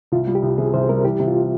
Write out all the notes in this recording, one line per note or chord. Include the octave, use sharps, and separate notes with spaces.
C2 F4
G3
G4
C2
C3 G#4
C2 C5
G3 A#4
E3 G4
C3
F4